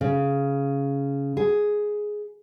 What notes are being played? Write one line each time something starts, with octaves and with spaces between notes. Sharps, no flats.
C#3
G#4